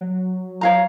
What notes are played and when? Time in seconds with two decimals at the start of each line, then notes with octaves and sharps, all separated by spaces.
0.01 F#3
0.61 C#5 F5 A#5